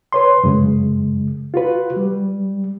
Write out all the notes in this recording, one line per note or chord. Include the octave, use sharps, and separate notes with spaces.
B4 C#5 C6
F#2 C#3 G#3
F4 F#4 B4
G3